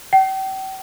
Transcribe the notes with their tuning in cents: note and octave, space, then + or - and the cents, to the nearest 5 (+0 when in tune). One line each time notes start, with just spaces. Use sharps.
G5 -40